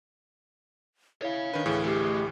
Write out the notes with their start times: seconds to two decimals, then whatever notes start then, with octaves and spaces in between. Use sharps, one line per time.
1.22 E4 C#5 F5
1.54 D#3 D4 B4
1.66 D2 A2 E3 G#4
1.85 A3 G4 G#4